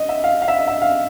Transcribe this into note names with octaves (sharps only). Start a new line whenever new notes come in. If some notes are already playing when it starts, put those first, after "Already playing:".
Already playing: D#5
E5
F5
F5
E5
D#5
E5
F5